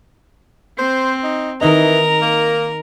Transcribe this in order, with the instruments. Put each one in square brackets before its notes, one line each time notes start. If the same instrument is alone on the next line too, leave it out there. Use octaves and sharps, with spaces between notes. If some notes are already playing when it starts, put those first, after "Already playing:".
[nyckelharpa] C4 [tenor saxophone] C5
[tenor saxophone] D#4
[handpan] D#3 D#4 D#5 [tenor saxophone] E3 [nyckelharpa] A#4 A#5
[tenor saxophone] A#3